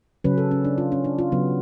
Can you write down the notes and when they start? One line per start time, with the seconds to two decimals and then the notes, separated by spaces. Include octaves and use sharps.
0.24 C#3 F#3 C#4 B4
0.38 A4
0.51 C#4
0.65 D4
0.78 F4
0.92 C#4
1.04 D4
1.19 F4
1.32 C#3 F#3 B3